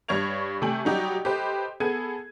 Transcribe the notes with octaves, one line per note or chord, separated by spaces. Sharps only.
G2 C#5 C#6 G#6 F7
C3 A3 G5 G#5 F#7
F#3 G3 D#4 F#4 G4
G4 A4 B4 C5 D#5
B3 G#4 A4 G#6 D#7